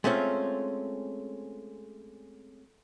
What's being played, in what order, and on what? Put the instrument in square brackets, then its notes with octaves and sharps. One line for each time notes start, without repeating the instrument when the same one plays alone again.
[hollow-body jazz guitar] G#3 A3 C4 C#4 F4